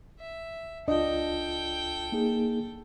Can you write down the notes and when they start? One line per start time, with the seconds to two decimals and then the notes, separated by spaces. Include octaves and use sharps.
0.19 E5
0.88 C#2 D4 F4 A4 D#5 G5
2.12 A#3 D#4 G#4